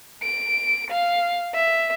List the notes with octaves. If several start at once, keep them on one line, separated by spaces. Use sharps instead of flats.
D7
F5
E5